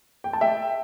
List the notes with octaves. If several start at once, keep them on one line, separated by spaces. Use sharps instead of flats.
G5
A5
E5 G5